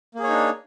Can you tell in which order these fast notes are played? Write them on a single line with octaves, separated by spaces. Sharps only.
A#3 G#4 C#5 D#4 D4